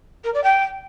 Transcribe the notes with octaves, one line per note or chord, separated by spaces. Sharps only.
A#4
D5
G5